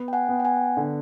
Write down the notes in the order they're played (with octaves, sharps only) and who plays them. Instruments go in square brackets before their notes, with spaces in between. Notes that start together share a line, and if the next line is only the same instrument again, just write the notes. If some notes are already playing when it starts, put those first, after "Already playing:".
Already playing: [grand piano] B3
[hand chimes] G5
F#5 G#5
[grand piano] B3
[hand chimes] G5
F#5 G#5
[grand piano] D3